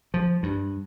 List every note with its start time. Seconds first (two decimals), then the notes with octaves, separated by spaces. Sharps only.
0.14 F3
0.43 G2